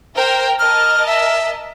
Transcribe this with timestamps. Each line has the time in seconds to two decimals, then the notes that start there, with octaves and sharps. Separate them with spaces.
0.16 A#4 C5 G5 A#5
0.59 A#4 D#5 A5 F6
1.07 E5